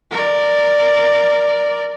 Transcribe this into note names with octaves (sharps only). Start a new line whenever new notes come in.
A#4 D5